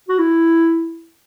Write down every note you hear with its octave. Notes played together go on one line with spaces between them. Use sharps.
F#4
E4